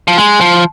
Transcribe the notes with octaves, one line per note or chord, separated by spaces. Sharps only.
F3
G#3
F3